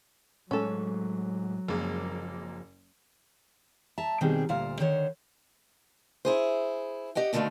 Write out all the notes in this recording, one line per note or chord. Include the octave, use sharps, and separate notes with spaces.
A2 F#3 G#3 C#4 A4
F#1 F#2 F3 G#3 A#3
E5 A5 A#5
B2 D#3 G3 C4 G4 G#4
D2 A#2 C5 F5 A#5
D3 D#3 C5 C#5
E4 G#4 C5
G4 D#5 F#5 G5
B2 D3 D#3 F3 A3 F5